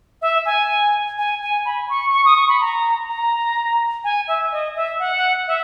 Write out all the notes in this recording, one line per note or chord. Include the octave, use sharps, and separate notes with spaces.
E5
G#5
G#5
G#5
B5
C#6
C#6
D#6
C#6
B5
A#5
A#5
G#5
E5
D#5
E5
F#5
E5